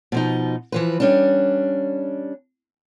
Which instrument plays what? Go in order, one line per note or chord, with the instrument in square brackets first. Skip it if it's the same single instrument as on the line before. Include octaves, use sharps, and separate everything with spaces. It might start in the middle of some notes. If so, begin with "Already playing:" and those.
[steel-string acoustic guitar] B2 F3 D#4
E3 F3 B4
G3 C#4 D4